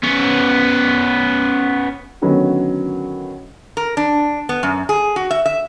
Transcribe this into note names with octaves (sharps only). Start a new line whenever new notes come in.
B3 C#4
D3 D#3 F#3 B3 C#4
A#4
D4
B3
F#2
G#4
F#4
E5
E5